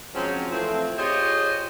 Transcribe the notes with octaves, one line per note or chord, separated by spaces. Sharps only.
F3 F#3 G#3 C4 C#4 D#4
E3 F3 A3 C4
F4 G4 G#4 C5 C#5 D#5